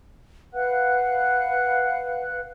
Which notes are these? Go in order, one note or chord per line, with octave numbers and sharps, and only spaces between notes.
B4 F5 F#5 F#6